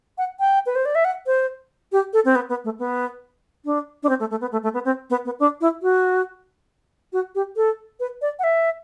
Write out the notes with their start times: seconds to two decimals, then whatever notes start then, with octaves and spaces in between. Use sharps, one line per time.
0.18 F#5
0.40 G5
0.66 B4
0.75 C5
0.85 D5
0.95 E5
1.05 F#5
1.26 C5
1.92 G4
2.13 A4
2.25 C4
2.35 B3
2.49 B3
2.64 A3
2.79 B3
3.65 D4
4.03 D4
4.09 C4
4.20 A3
4.30 A3
4.41 B3
4.52 A3
4.63 A3
4.74 B3
4.85 C4
5.10 B3
5.25 B3
5.40 D4
5.61 E4
5.82 F#4
7.13 F#4
7.35 G4
7.56 A4
8.00 B4
8.21 D5
8.39 F#5
8.43 E5